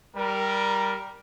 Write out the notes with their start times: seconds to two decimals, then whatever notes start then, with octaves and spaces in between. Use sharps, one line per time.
0.15 G3 A#4